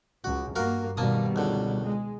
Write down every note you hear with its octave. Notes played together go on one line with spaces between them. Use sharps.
C#2 F#4
G2 A#3 F#4 A#4 F5
B2 D#3 G3 A#3 A5 D#6
C#2 D3
G#3